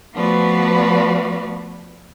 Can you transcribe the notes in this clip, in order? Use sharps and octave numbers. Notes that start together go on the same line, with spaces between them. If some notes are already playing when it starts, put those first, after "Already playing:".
F3 A3 B3 F#4 B4 D5